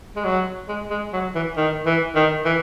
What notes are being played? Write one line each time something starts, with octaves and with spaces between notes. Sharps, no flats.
G#3
F#3
G#3
G#3
F#3
E3
D#3
E3
D#3
E3